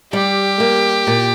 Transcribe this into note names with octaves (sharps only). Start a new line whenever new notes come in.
G3 G4
A#3
A#2